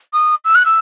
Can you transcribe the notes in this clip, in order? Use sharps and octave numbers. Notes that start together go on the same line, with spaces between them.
D#6
E6
F#6
E6